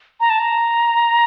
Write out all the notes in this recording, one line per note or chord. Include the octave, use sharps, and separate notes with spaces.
A#5
A5
A#5